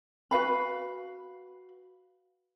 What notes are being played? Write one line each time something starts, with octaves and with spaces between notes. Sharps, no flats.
F#4 B4 F5 B5